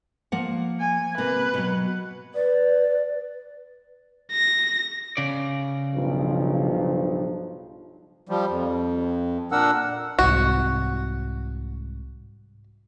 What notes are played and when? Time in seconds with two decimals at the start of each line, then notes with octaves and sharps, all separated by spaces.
0.32 F3 A#3 F#5
0.80 G#5
1.18 C3 A#3 B4
1.54 B2 F#3
2.34 B4 D5
4.32 A#6
5.17 C#3 D5
5.95 B1 G2 F3
8.29 F3 G3
8.49 F2
9.52 A#2 D4 A#4 F#5 E6
10.19 C2 G#2 F#4